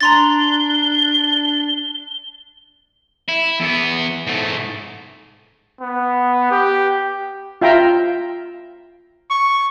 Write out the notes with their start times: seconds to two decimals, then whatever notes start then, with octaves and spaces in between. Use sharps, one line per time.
0.01 D4 A#5 C6 A6 G7
3.28 E4
3.60 E2 B3
4.27 G#2 A3
5.81 B3
6.51 G4
7.61 F4 E5 G5 A#5 C6
9.30 C#6